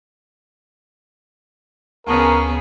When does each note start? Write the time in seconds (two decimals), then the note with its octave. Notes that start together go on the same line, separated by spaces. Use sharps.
2.07 D2 C#3 B3 G#4 A#4 A5 A#5 C#6